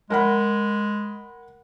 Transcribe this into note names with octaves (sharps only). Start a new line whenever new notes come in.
G#3 A#4 F#5 B5